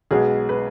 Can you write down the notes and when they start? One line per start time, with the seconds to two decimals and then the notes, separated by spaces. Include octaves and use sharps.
0.11 B1 B2 G#3 B3 G#4
0.49 B4